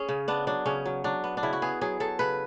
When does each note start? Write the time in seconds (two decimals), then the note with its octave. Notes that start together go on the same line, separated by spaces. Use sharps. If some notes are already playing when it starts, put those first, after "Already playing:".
Already playing: C#4 G#4
0.09 C#3
0.28 B3 D4
0.47 F#3 D4
0.66 C#3 C#4
0.85 F#3
1.04 F#3 D4
1.24 B3
1.37 D4
1.43 C#3 E4
1.53 F#4
1.62 B3 G#4
1.81 F#3 G#4
2.00 F#3 A4
2.19 C#3 B4